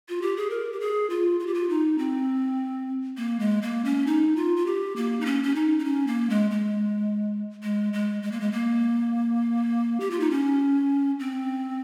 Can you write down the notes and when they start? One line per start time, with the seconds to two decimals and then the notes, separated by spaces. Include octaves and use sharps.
0.09 F4
0.22 G4
0.37 G#4
0.50 A#4
0.72 G4
0.80 G#4
1.10 F4
1.40 F4
1.47 G4
1.54 F4
1.69 D#4
1.98 C4
3.17 A#3
3.40 G#3
3.62 A#3
3.85 C#4
4.07 D#4
4.36 F4
4.57 F4
4.66 G4
4.96 A#3
5.21 D#4
5.26 C#4
5.43 C#4
5.55 D#4
5.79 D#4
5.85 C#4
6.07 A#3
6.30 G#3
6.51 G#3
7.63 G#3
7.93 G#3
8.22 G#3
8.32 A#3
8.40 G#3
8.52 A#3
10.00 G4
10.11 F4
10.20 D#4
10.31 C#4
11.20 C4